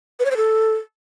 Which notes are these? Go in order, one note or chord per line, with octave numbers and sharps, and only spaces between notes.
B4
C#5
C5
A4